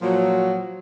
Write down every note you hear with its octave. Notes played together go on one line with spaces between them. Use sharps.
A#2 F3 F#3